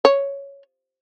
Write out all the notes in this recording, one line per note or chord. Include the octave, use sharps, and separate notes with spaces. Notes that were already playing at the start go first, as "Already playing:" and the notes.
C#5